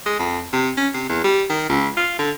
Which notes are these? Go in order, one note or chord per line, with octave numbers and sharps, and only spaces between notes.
G#3
F2
C3
C#4
C3
E2
G3
D#3
C#2
F4
D3